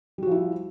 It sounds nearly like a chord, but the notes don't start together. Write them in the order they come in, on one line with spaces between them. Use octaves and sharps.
G3 F#4 F3 E4